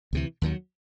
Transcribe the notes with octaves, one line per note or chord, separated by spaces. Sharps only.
D2 C3 E3
D#2 D#3 F#3